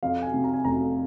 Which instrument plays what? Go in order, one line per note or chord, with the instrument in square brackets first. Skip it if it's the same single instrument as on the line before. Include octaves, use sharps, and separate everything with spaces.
[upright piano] F2 F5
G#5
C3
A#5
G#5
F1 A#5